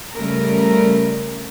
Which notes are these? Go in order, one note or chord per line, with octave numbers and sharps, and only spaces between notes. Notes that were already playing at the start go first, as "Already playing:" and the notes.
C#3 G3 A3 A#4